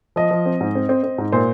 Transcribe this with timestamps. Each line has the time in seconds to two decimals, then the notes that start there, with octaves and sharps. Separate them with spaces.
0.16 F3 D#5
0.31 F3
0.46 C4
0.61 G#2
0.75 C4
0.89 C4
1.03 C4
1.18 G#2
1.32 A#2 C5